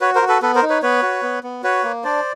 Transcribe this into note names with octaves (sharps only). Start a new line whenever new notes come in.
F#4 B4 C#5
A#4 C5
F#4
A4 B4
B3 A4 B4
A#4 C5
D#4
B4 C#5
B3 B4 C#5
F#4
B3
B3
F#4 B4 C#5
A#3
D4 C5 D5